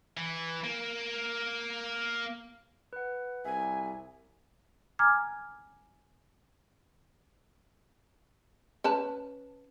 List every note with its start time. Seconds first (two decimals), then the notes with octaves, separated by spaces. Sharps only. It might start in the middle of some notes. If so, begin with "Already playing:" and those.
0.17 E3
0.64 A#3
2.93 B4 F#5
3.45 C2 E5 G#5
4.99 G#5 A#5 D6 F6 G#6
8.84 C#4 B4 A5